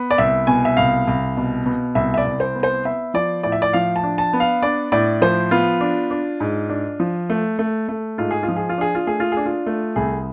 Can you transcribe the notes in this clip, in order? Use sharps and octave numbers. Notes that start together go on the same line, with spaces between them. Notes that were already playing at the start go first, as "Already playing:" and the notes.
Already playing: B3
D5
C2 E5
B2 G#5
E5
C2 F5
C2
B2
B2
C2 E5
E5
D5
C2
C5
B3
C5
B3 E5
F3 D5
A2 D5
E5
D5
F3 F5
A5
D4
A5
B3
F5
D4 D5
A2 D5
F3 C5
B3 F4
D4
D4
G#2
D4
F3
A3
A3
A3
G#2 F4
G#4
F4
F3
G#4
F4
D4 G#4
F4
A3 G#4
F4
D4 G#4
F4
A3
C2 G#4